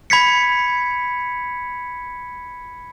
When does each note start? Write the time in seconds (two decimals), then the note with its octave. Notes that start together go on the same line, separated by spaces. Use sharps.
0.10 B5 G#6 B6 C#7